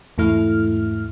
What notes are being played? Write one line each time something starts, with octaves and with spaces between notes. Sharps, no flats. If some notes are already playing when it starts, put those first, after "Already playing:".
E2 G#2 A3 E4 F6